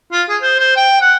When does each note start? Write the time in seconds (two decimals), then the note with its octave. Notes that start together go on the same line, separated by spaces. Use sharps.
0.12 F4
0.29 G#4
0.42 C5
0.59 C5
0.76 G5
1.01 F#5